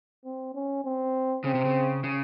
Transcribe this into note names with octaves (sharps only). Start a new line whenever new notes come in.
C4
C#4
C4
C#3 C4
C3
C#3
C#3